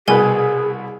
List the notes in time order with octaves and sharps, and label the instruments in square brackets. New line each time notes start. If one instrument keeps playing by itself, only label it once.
[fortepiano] C2 B2 B4 [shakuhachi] G#4 [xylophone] A#4 G#5